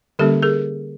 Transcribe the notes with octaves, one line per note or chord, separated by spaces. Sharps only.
D3 G3 A#3 C#4 G4 A4
G#4 A#4